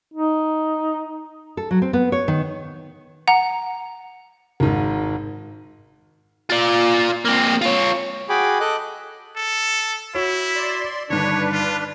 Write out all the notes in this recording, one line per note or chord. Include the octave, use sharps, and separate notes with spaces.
D#4
A4
F#3
C4
B3
C#5
D#3
F#5 A#5
G#1 G#2
F4 D5
A#3 C4
F4 C#5
F#4 G#4 G5 G#5 B5 D6
A4 D#5 D6 F#6
A4
E4 F#4 C#5
D5 C6
G2 D3 D#3 D4 B4 C#5
F4